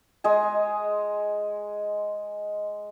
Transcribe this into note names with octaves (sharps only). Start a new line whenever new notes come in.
G#3 D#5 G#5